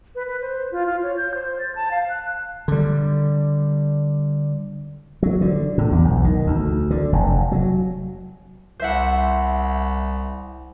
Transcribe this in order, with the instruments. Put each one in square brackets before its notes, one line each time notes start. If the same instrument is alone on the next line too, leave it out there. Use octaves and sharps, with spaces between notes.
[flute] B4
B4
C5
F4
F4
C#5
G6
C5
A6
A5
F5
F#6
[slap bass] D3 G3
F#3
D3
A2
E2
B1
D#3
D2
D3
F1
F#3
[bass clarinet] C2 [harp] C5 E5 F#5